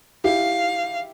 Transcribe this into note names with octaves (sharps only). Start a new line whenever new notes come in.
E4 G4 F5